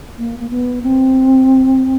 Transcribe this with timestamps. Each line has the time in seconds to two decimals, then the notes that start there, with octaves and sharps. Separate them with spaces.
0.18 A#3
0.39 A#3
0.50 B3
0.83 C4